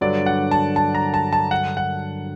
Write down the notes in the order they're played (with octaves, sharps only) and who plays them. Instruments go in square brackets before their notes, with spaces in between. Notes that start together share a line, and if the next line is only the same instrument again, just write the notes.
[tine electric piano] G2 D3 F#3 [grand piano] D5
[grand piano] F#5
A5
A5
A#5
A5
A5
F#5
F#5